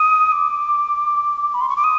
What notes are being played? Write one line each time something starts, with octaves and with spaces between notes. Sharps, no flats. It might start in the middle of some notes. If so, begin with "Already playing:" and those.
Already playing: D#6
D6
B5
C6
C#6
D6
D#6